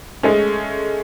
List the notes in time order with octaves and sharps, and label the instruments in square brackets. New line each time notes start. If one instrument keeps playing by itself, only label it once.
[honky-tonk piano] G#3 A3 C#4